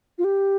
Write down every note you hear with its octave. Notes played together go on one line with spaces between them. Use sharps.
F4
G4